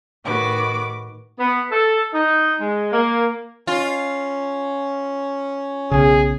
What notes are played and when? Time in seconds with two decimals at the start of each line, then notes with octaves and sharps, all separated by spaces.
0.24 A2 D#3 F#4 B4 D6
1.39 B3
1.71 A4
2.14 D#4
2.60 G#3
2.92 A#3
3.67 C#4 F4
5.91 B1 C#3 G#4